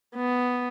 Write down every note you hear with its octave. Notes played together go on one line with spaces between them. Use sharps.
B3